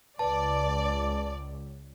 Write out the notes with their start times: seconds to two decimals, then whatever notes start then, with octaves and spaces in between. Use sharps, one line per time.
0.19 C#2 B4 D5 A5